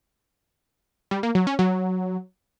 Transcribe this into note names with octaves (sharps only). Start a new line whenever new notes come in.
G3
A#3
F#3
C#4
F#3